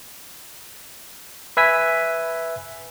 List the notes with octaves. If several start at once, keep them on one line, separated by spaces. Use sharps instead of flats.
B4 E5 G#5 B6